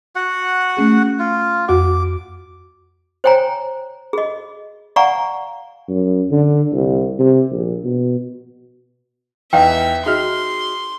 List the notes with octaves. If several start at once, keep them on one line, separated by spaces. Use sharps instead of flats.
F#4 F#5
A3 C#4 G#4
F4
F2 F#4 F#5 D6
C5 C#5 G5 G#5 A#5
G#4 D#5
D5 F5 F#5 G#5 A#5 C#6
F#2
D3
C2
C3
A#1
B2
E2 D#4 E5 F5 G5
D#4 F#4 G#4 E5 C6 F6